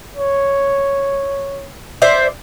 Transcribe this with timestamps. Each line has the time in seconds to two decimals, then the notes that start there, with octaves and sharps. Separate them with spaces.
0.16 C#5
2.02 C5 D5 E5